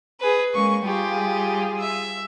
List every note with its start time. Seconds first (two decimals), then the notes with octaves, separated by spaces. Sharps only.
0.21 G#4 B4
0.54 G#3 A#3 C#4 C#6
0.85 G3 F4 G4 G#4
1.80 E5